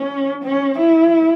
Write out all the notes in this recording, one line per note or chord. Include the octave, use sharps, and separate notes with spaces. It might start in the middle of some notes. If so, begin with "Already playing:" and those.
Already playing: C#4
C#4
E4